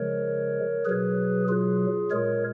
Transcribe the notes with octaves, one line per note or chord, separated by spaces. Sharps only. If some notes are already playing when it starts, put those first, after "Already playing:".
Already playing: C#3 F3 G#3 A#4 C#5
B2 F#3 G#4 B4
F4 G#4
A#2 G#3 A#4 C#5